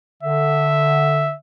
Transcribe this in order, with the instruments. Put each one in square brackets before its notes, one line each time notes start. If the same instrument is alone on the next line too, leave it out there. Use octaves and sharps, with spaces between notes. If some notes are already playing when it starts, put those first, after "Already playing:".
[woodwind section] D3 [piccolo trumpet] E5